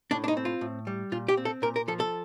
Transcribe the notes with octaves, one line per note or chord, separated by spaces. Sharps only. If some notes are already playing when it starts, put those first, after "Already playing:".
A2 D4
D4
D#4
C4
F4
A2
G3
A#2 F4
G4
C4
A4
A#2 A#4
A#4
F3 A4
A4